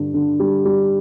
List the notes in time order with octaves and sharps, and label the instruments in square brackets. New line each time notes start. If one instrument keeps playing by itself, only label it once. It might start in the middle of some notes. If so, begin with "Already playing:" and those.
Already playing: [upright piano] G2 D3
D3
G3
G3